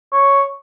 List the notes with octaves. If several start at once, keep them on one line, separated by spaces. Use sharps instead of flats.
C#5